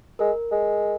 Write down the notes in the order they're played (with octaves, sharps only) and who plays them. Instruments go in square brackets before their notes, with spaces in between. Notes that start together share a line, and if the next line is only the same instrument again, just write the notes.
[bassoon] G#3 [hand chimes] A#4
[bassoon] G#3